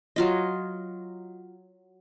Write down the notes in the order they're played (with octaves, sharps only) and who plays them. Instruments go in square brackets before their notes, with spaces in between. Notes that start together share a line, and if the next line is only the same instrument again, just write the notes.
[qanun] F#3 F4 D#5